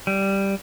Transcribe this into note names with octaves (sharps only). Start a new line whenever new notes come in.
G3